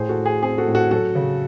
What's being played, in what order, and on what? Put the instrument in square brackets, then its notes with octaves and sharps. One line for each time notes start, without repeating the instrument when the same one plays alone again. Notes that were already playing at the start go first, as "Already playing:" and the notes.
Already playing: [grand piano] A2 G#4 C5
F#4 A4
A2
G#4
C4 G#4
F#4 A4
A2
F#4 A4
F#3 F#4 A4
C#3